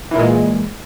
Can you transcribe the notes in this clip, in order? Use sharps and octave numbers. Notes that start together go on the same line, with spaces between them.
A#2 E3 G#3